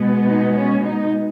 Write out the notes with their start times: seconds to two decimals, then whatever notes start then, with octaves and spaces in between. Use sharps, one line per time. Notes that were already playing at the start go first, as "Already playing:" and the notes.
Already playing: B2 G#3 B3
0.28 D#4
0.56 C#4
0.83 D#4